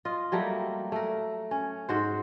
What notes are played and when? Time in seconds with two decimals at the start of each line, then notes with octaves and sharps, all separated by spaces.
0.05 F4 D#5
0.32 F#3 G3 A3 A#3
0.92 A3 A#4
1.51 C#4
1.89 G#2 F#4 C5